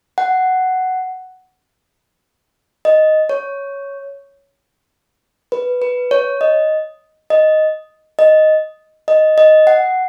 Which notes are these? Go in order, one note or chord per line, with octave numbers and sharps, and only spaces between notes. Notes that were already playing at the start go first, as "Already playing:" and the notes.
F#5
D#5
C#5
B4
B4
C#5
D#5
D#5
D#5
D#5
D#5
F#5